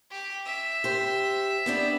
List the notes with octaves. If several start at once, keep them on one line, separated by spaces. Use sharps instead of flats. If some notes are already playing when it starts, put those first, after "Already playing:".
G4
E5
G4 C5
B3 C4 D4